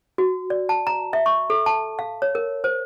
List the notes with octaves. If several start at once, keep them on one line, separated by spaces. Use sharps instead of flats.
F#4
D5
A5
A#5
E5
C#6
A4
A5
F5
C#5
A#4
C5